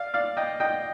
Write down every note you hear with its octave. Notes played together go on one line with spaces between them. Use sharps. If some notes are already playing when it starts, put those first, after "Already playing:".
Already playing: D5 F5
D5 F5
D#5 G5
D#5 G5